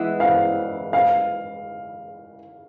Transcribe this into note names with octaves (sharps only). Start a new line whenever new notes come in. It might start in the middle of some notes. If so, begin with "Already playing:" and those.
Already playing: E3 G#3 B3 E4
F5
F5